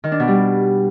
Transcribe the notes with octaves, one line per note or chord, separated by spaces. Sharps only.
D#3
D4
B2
G3